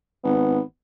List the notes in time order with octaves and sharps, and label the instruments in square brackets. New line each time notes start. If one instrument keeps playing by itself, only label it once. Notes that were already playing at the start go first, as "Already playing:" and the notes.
[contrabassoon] G#1 [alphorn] B3